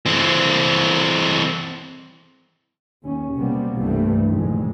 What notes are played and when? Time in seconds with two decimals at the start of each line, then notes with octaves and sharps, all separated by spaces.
0.06 E3 C4
3.04 D#2 C#4
3.35 B1 C3 G3 A#3 B3
3.77 C2 G2 E3 G3 A3
4.29 F1 A#1 F2 D#3 G#3